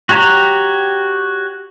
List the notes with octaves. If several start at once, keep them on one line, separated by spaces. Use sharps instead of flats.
F#4 G4 C#5 A#5